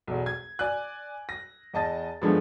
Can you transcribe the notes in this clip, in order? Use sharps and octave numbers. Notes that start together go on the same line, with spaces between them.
B1 E2
G#6
D5 G#5 F#6
A#6
E2 D#5 A5 A6
G2 F3 G#3 A3 B3